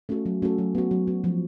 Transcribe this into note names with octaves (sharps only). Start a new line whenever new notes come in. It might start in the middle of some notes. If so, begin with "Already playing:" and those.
A3 C#4 F#4 A4
F#3
A3 C#4 F#4 A4
F#3
B3 F#4
F#3
B3 F#4
F3